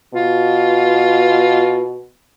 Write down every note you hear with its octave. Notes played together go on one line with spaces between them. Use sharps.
B2 F4